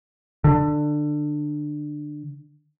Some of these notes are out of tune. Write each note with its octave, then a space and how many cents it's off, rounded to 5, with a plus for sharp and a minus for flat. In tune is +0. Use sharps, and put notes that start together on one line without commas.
D3 +20